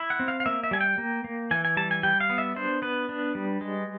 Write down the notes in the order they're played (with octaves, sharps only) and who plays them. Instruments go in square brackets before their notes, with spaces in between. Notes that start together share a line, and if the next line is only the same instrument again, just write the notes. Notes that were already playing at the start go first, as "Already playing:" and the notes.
Already playing: [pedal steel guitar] E4
F#5
C4
F5
F5
A#3 E5
E5
G3 G#5
G5
A#3
A#3
E3 G#5
G#5
G3 A5
G#5
G3 G5
F5
B3
E5
D4 C5
B3 B4
D4
G3
G#3